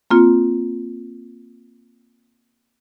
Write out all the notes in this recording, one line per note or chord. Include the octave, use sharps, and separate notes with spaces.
A#3 C4 F4